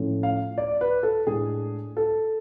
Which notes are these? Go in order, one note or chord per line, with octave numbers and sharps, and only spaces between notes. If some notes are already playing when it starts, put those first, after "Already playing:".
Already playing: A2 F3 A3 C#4
F5
D5
B4
A4
A2 G#3 D4 G#4
A4